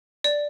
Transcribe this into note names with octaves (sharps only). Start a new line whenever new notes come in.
D5